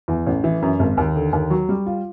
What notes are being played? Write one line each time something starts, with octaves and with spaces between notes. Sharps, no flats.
E2
A1
E3
F#2
G#1
D#2
D3
D#2
F#3
G3
F4